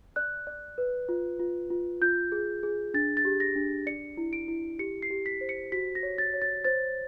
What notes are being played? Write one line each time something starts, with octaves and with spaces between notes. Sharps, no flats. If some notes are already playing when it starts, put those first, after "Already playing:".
D5 F#6
D5
B4
F4
F4
F4
F4 G6
G#4
G#4
D4 A6
A6
G4
A#6
D4
D5 C#7
E4
D7
E4
G4 C#7
C7
G4
B6
C5
C#7
F#4 B6
A#6
C#5
A6
C#5
A6
C5 A6